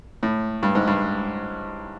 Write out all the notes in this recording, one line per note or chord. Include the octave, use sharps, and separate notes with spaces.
A2
G2
G#2
G2